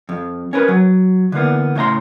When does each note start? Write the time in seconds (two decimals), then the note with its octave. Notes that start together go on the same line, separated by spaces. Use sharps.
0.09 F2
0.53 C#4 A#4 B4
0.68 F#3
1.32 D3 E3 A#3 B3
1.75 A2 C#3 E5 A#5 C6